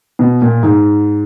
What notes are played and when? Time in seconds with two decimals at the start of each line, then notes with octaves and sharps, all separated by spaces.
0.19 B2
0.42 A#2
0.63 G#2